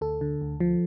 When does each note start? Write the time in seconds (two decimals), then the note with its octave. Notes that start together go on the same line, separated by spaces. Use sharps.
0.01 D2 A4
0.21 D3
0.41 D2
0.60 F3